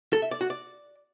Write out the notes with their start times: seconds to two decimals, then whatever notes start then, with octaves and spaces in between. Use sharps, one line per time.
0.13 A4
0.22 E5
0.31 D5
0.41 F#4
0.50 D5